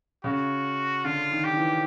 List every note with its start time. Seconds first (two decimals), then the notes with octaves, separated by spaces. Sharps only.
0.24 C#3 F#4
1.04 D3 F4
1.32 D#3
1.44 G4
1.52 D#3
1.57 E3